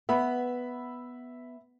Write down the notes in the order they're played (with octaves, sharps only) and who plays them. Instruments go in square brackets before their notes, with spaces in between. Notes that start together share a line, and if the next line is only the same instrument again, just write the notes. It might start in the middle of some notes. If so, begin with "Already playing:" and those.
[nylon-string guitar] B3 [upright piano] E5 B5